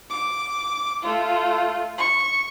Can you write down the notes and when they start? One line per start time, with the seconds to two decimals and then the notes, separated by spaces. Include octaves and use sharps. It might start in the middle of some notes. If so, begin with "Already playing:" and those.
0.10 D6
1.02 A3 F4
1.98 C#6